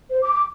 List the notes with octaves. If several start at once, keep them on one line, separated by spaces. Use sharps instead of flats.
C5
D6
D6